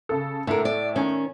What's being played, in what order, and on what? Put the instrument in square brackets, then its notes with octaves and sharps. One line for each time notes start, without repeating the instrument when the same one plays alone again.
[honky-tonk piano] C#3 A4
[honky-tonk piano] A2 E5 [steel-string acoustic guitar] D3 A#4
[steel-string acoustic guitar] D5
D#3 C#4